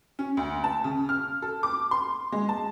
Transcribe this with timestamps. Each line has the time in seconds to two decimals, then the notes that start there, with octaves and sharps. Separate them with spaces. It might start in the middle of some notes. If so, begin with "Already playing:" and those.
0.19 C#4
0.37 D2
0.64 A5
0.84 C#3
1.09 F6
1.42 A4
1.63 D6
1.91 C6
2.32 G#3
2.49 A5